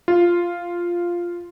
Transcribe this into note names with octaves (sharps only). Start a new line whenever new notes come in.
F4